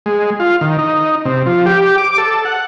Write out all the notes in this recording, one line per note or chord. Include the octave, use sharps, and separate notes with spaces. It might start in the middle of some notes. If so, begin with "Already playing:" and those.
G#3
F4
D#3
D#4
C3
F3
G4
D6
A4
F#5